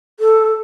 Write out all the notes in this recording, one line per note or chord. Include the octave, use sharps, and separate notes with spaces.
A4